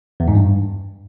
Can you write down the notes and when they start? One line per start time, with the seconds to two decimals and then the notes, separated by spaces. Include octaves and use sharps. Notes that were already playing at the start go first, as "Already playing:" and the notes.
0.20 E2
0.28 G#2
0.35 G2